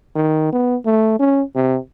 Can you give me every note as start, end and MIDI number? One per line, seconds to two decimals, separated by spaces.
0.15 0.48 51
0.52 0.76 59
0.85 1.16 57
1.19 1.42 61
1.55 1.78 48